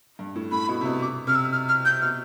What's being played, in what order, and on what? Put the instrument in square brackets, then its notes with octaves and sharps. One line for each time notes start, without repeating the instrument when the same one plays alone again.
[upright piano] G2
A2
[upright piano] A2 [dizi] B5
[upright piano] B2
C3
B2
[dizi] D6
[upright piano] C3 [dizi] F6
[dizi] E6
F6
F6
G6
[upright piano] B2 [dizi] F6